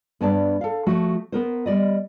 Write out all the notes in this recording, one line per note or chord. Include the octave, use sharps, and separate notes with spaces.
G2 B3 C#5 D5 A5
A4 F5
F3 A3 F#4
B3 A#4 C5
G3 D5 D#5